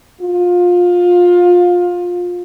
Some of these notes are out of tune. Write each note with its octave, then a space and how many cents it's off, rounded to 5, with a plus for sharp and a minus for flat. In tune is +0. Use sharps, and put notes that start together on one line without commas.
F4 +25